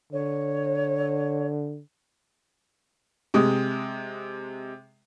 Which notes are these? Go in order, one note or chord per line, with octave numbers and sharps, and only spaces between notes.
D3 C#5
C3 G#3 D#6